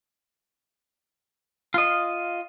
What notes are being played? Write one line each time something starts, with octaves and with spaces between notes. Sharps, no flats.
F4 D#5